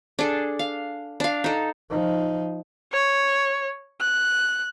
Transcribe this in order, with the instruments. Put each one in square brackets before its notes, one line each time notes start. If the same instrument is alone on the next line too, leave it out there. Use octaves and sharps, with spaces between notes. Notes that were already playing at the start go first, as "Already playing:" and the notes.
[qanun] D4 G#4 A4
F5
D4 F5
D#4 A4
[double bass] F3 D#4
[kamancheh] C#5
F#6